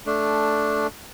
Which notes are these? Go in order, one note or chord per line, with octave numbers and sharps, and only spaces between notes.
A3 D4